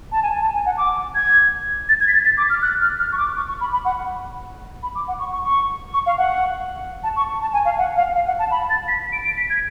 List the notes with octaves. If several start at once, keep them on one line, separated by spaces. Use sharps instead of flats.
A5
G#5
A5
G#5
F#5
D6
G#6
A6
G#6
B6
A6
A6
D6
F6
F#6
F6
F6
C#6
D6
C#6
C#6
B5
B5
F#5
B5
D6
F#5
C#6
C#6
C#6
C#6
F5
F#5
A5
C#6
A5
G#5
F5
F#5
F5
F5
F#5
A5
B5
A6
B6
D7
D7
B6
G#6